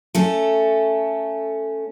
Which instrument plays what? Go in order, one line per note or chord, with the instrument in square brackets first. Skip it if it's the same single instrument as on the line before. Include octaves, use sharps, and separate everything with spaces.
[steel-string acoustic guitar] A3 C#4 A4